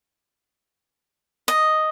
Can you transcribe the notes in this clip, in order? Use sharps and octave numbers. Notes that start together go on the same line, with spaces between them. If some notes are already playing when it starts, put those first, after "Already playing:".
D#5